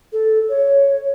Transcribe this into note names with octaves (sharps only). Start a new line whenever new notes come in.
A4
C#5